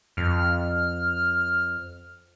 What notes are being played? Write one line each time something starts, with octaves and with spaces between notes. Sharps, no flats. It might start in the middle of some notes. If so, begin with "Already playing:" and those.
F2 F6